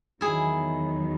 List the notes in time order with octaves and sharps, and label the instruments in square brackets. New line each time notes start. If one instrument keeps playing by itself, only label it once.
[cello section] E2 D#3 F#3 [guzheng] E4 G#4